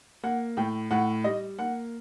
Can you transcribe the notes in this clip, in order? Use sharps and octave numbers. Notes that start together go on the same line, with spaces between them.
A#3 F#5
A2 G5
A2 F#5
G3 D#5
A#3 F#5